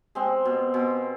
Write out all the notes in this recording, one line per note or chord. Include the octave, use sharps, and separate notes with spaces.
G#3 C4
B2
B2